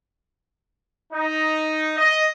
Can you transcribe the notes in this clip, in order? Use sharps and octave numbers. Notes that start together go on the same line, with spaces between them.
D#4
D#5